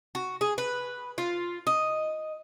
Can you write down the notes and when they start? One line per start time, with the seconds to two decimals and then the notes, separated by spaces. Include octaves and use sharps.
0.15 F#4
0.41 G#4
0.58 B4
1.18 F4
1.67 D#5